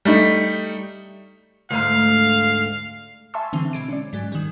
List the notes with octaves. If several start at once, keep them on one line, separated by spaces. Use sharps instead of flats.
G3 A3 D#4
D2 G#2 F5
E5 G#5 A5 C6 C#6 E6
D3 E3 F#3 C4
B2 G#3 D7
C#4 D5
G#2 F#3 G#3
D#3 G3